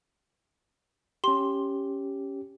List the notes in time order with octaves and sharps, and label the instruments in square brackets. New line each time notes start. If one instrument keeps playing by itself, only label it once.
[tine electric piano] C#4 G4 [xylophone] C6